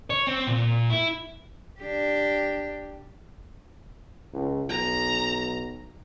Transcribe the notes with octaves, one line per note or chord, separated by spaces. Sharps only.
C#5
C4
A#2
E4
D4 G4
C#2
B1 A#5